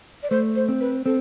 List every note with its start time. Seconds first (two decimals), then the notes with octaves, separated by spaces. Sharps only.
0.23 D5
0.30 A3 C5
0.56 C5
0.69 C4
0.80 B4
1.06 C4 A4